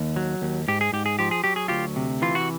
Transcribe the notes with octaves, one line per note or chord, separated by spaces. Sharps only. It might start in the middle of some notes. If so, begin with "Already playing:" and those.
Already playing: D#2
F#3
D#2
G#2 G4
G#4
G#2 G4
G#4
F3 G4
G#4
F#3 G4
G#4
D2 F4 G4
C3
E3 F4
F#4